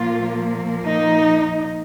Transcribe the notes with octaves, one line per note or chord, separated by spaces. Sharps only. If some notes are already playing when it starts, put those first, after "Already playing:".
Already playing: A#2 F3 A#3 F4
D#4